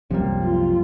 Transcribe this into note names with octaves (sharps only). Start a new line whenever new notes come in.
C2 F#2 C3 F3 G3 A#3
F4